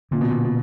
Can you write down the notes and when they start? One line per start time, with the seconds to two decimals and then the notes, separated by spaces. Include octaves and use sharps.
0.11 A#2 D3 A#3 C#4
0.21 B2
0.30 A#2
0.44 B2